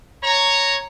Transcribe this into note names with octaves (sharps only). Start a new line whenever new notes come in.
C#5 A#5